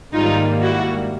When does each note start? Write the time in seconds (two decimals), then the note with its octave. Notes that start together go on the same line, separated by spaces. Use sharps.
0.13 G#2 D#3 G3 A#3 D#4 F4
0.62 E4 F#4